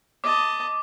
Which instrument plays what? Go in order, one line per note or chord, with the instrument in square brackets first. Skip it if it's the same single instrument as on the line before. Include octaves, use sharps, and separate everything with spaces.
[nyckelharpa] D#5 A5 [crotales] D6